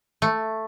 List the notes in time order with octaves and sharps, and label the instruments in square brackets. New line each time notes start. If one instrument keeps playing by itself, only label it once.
[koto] A3